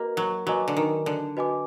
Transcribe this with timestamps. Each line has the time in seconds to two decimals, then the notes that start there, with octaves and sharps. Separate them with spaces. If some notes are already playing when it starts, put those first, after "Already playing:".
Already playing: A#3 F#4 B4 D#5
0.17 F#3
0.46 F#3 F#4 B4 D#5 G#5 D6
0.68 D3
0.77 D#3
1.06 D3
1.37 F#4 B4 D#5 G#5 D6